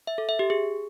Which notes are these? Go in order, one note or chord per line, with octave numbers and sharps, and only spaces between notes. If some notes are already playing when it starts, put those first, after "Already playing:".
E5
A4
E5
G4
G#4